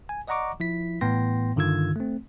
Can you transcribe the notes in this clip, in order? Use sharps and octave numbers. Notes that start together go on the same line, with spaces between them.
G#5
D5 D#5 F#5 A#5 C#6 D6
F3 E4 B6
A2 E3 B3 G5 C6 A#6
G2 D3 D#3 F4 E6 G#6
A3 C4